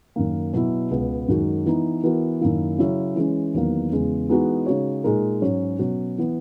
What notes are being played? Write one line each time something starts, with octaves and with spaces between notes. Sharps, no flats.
F#2 D#3 A#3
B2 F#3 B3 E4
C#2 B2 G#3 B3
F#2 D#3 G#3 D#4 F#4
E3 B3 D#4
E3 B3 F#4 A#4
F#2 D#3 A#3 E4
C#3 F#3 C#4 E4
E3 G#3 C#4
E2 D#3 F#3 A#3
E2 C#3 G#3
E3 G#3 B3 D#4 F#4
C#3 G#3 D#4 F#4 C#5
A#2 G#3 D#4 A#4
G#2 F#3 C#4 F#4 C#5
B2 F#3 C#4 F#4
E3 B3